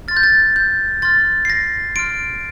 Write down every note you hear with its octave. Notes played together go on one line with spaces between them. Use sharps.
C6 F6 A6
G6
A6
G6
C6 F6 A6
C7
A#6
C6 F6 D7